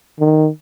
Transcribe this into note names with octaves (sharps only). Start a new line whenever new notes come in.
D#3